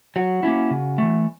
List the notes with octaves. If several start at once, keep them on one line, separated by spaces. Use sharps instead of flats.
F#3 F#4
A#3 C#4 E4
C#3
E3 A3